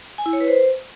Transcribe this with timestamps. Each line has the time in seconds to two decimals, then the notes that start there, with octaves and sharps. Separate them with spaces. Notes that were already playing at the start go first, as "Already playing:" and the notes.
0.18 G#5
0.26 E4
0.33 C#5
0.41 B4
0.48 C5